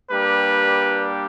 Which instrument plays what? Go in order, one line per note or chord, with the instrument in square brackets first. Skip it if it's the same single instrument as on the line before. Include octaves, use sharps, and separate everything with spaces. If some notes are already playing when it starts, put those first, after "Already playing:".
[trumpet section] G3 A#3 D4 G4 B4